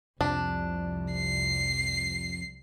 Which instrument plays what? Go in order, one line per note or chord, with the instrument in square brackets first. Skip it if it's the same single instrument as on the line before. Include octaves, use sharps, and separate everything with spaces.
[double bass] C2 [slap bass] F2 C3 F3 [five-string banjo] D4
[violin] C7